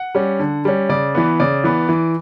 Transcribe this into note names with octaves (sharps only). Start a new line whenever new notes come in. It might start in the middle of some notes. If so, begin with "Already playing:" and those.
Already playing: F#5
G3 C#4
D3
G3 C#4
C#3 D5
E3 B3
C#3 D5
E3 B3
E3